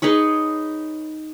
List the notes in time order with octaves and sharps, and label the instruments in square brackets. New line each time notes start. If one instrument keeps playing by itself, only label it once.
[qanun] D#4 G#4 B4 C#5